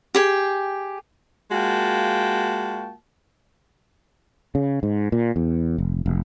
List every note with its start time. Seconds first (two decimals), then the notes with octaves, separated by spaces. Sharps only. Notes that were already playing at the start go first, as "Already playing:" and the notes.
0.15 G4 G#4 G5
1.51 G#3 A#3 F4 F#4 G5 A5
4.55 C#3
4.83 G#2
5.12 A#2
5.36 E2
5.78 F1
6.06 F1